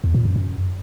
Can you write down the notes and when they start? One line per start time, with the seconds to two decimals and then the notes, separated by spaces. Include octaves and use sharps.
0.04 E2
0.14 A#2
0.25 F#2
0.36 F#2